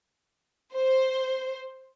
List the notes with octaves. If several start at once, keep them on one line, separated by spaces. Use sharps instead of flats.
C5